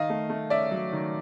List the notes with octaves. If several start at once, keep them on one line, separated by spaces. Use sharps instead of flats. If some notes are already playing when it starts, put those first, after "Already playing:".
Already playing: D#3 D#5 F5
A3
A3
C#4 D5 E5
F#3
D#3